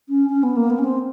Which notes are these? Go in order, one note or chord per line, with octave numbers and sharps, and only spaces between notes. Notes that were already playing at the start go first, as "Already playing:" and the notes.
C#4
C#4
B3
A#3
B3
C#4
C4